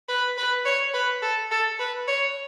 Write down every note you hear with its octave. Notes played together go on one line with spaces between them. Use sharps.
B4
B4
C#5
B4
A4
A4
B4
C#5